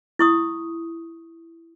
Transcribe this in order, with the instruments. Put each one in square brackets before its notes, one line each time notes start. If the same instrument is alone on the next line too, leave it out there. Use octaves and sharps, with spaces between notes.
[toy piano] E4 C#6 D#6